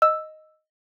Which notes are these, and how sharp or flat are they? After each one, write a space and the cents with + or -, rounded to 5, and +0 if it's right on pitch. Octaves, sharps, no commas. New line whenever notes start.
D#5 +0 E6 +0